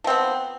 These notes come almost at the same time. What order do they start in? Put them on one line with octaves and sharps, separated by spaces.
F3 C4 B3